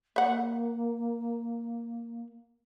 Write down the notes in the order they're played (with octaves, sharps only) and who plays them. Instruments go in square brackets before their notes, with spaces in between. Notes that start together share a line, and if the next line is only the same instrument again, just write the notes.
[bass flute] A#3 [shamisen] E5 F#5